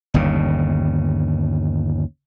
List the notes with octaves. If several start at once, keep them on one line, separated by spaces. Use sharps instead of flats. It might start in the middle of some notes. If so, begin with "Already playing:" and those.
G1 D#2 C#3